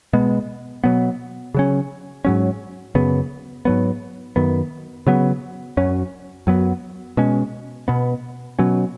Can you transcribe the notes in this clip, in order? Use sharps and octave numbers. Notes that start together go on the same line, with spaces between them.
B2 G#3 B3
B2 F#3 B3
C#3 F#3 C#4
G#2 F#3 C#4
F#2 C#3 B3
G#2 F#3 B3
F#2 D#3 B3
C#3 F#3 B3
F#2 F#3 C#4
F#2 F#3 B3
B2 G#3 C#4
B2 B3
B2 F#3 C#4